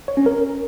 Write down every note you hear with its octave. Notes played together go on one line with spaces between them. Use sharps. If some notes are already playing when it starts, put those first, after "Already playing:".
C#5
C#4
A#4